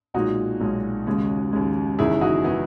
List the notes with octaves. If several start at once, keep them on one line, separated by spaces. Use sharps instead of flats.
B1 A#2 G#3 D#4 F#4
B1 A#2 G#3
D#2 C#3 G#3
D#2 C#3 G#3
F#1 E2 D#3 E4 G#4
D#4 F#4
D#3 B3 D#4